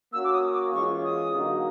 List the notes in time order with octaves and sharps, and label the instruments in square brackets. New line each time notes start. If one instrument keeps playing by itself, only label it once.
[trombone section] A#3 C#4 F#4 [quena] E6
[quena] D6
D#6
D6
[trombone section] E3 G#3 C#4 F4 G#4 [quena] C#6
[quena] D#6
[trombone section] D3 F#3 A#3 D#4 F#4